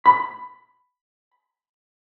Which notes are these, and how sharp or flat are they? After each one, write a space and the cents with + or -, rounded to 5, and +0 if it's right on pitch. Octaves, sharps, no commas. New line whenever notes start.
B5 +10